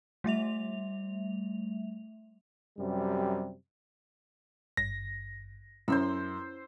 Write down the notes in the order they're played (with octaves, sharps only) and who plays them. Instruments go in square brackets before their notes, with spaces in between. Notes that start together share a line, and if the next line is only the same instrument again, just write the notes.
[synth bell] G3 A3 E5 F7
[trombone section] F#2 C3 G3
[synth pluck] G#1 G2 [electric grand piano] A#6
[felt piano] F#2 [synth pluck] C#4 E4 [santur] C5 C6 E6